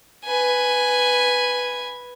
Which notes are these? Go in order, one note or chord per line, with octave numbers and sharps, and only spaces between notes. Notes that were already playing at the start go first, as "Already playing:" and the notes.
B4 G#5